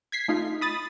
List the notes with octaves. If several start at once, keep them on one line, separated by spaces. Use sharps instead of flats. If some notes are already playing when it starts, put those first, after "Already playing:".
G#6 B6 C7
A3 D#4 F4
B5 D#6 A6